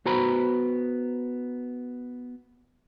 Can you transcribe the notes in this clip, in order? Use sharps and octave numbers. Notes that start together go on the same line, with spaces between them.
B3 F#4 C5 A#5 B5